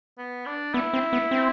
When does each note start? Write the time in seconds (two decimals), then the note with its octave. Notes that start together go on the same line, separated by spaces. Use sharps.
0.18 B3
0.46 D4
0.74 B3 E4
0.93 C4
1.13 B3
1.31 C4